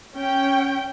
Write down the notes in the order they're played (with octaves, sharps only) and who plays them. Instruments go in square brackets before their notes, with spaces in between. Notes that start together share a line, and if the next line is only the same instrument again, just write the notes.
[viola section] C#4 G5